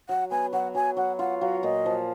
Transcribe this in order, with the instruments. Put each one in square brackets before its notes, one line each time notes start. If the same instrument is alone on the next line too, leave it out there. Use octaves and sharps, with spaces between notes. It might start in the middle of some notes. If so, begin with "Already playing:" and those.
[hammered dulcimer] F#3 [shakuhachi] F#5
[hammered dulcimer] B3 [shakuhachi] G#5
[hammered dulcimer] F#3 [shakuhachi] F#5
[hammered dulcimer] F#3 [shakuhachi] G#5
[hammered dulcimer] F#3 [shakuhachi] F#5
[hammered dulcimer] F4 [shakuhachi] F#5
[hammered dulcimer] F#3 [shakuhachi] F5
[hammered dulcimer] A#2 [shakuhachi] D#5
[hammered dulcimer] F3